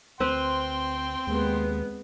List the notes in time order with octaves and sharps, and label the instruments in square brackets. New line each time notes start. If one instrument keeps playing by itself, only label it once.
[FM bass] D2 [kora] C4 B4 [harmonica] G5 C6
[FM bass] D#2 [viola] G#3 B3